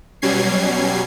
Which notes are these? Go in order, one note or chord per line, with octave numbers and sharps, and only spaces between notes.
B2 F#3 G3 C#4 G#6 C7